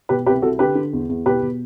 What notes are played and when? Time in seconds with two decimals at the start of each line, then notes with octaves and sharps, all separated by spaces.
0.09 B2 G4 B4
0.26 C2 G4 B4
0.42 C2 F#4 A4
0.59 D3 G4 B4
0.75 D3
0.93 E2
1.09 E2
1.26 B2 G4 B4
1.42 B2